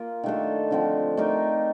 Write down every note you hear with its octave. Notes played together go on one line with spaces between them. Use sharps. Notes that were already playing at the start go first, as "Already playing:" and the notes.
Already playing: A#3 F4 A#4
D#3 A3 D4 A4
D3 F3 C4
A3 D#4 A#4 D5